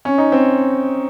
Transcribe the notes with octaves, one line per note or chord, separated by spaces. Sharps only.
C#4
D#4
C4